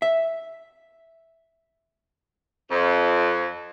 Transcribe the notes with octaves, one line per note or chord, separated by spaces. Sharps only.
E5
F2